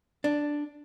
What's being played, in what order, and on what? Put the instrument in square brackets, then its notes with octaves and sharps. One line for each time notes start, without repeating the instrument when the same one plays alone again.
[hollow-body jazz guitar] D4